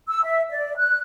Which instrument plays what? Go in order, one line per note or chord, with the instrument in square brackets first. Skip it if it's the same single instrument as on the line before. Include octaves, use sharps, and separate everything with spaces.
[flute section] E6
E5
D5
F#6